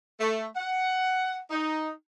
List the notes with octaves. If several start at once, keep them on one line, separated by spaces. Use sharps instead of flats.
A3
F#5
D#4